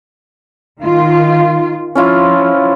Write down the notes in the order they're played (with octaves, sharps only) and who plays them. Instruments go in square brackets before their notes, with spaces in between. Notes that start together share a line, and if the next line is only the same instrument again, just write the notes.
[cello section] D#3 F4
[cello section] F3 [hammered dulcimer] C#4 E4 F4